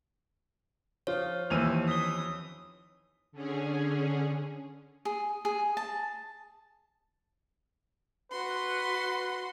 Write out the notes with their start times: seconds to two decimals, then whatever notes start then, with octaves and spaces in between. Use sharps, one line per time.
1.07 F3 F4 C#5
1.50 D#2 E3 F3 E6 D#7 F7
1.88 D#6 B6 G7
3.32 D3 C#4 G#4
5.05 G#4
5.45 G#4
5.77 A5
8.32 F#4 B4 C6